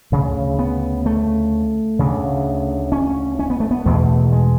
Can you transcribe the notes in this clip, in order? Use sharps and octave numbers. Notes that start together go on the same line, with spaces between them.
D2 C#3
B3
A3
D2 C#3
C#4
C#4
B3
A3
B3
E2 B2 A3
G#3